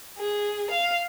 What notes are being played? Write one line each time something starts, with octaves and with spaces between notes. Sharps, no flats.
G#4
F5